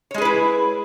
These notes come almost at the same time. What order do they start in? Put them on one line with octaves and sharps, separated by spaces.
C#5 G#3 G#4 B4 E4